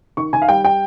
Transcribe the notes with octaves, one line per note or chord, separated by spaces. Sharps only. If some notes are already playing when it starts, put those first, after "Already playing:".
D#3 C#6
D#3 G#5
F5
G3 G5
G5